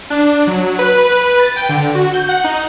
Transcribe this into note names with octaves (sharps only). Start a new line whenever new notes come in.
D4
F#3
B4
B4
A6
G5
D3
F#4
G6
F#5
D#4